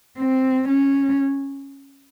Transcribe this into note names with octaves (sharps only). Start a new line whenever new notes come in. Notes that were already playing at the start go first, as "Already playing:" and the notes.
C4
C#4